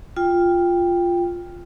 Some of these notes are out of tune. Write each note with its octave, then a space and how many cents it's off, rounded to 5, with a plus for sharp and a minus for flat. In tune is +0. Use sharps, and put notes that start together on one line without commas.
F4 +0 G5 +10